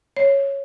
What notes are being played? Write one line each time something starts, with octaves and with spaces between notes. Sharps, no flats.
C#5